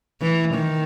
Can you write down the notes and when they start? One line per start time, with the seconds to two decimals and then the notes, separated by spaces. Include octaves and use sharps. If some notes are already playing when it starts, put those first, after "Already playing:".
0.22 E3
0.55 D#3